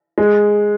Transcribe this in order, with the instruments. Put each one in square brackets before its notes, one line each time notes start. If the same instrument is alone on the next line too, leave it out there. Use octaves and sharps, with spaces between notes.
[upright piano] G#3